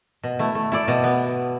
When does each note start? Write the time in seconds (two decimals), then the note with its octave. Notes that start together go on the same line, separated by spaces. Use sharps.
0.23 B2
0.39 A3 E4
0.55 A3
0.72 E4 A4 D5
0.88 B2
1.04 B3